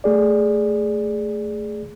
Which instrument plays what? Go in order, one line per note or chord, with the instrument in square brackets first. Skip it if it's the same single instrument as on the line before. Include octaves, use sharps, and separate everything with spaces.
[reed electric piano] A3 G#4 D5